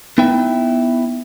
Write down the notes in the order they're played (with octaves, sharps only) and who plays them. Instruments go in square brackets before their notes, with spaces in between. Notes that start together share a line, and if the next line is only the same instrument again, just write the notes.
[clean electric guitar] B3 D#4 E4 E5 G5